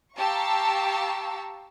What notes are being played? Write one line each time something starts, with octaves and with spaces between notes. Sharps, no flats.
G4 F5 A5 A#5 C#6 E6